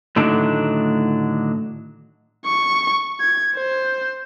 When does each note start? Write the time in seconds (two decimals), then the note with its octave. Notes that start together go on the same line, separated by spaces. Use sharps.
0.16 A2 D3 D#3 F#3 D4
2.46 C#6
3.20 G#6
3.55 C5